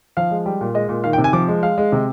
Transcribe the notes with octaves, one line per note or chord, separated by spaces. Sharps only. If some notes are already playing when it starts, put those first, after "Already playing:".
F3 F5
G#3
G3
A#2
G#3 D#5
A#2
D#3 F5
G5
C3
G#5
F3 D6
G#3
G#3 F5
G#3
C3